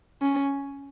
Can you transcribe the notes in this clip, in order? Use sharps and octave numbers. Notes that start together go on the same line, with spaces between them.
C#4